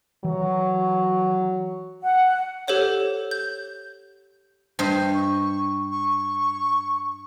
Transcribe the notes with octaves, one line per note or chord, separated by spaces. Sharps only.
E3 F#3
F#5
G4 A4 C5 C#5 F#5
G6
G2 C5 D#5
C#6
C#6